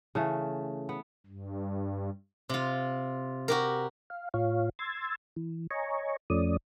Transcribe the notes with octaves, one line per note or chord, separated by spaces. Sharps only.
C#3 E3 A3
B3
G2
C3 F4
F#4 G4 A#4
F5
A2 F4 C#5 F5
C6 E6 G#6 A6
E3
C#5 D#5 G#5 A#5 C#6
F2 F3 A3 C#4 D5 D#6